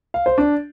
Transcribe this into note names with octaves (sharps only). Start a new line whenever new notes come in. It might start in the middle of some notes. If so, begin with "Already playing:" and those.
F5
C5
D4